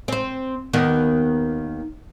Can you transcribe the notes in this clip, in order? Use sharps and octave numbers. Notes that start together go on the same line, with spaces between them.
C4 C5
D#2 D#3 B3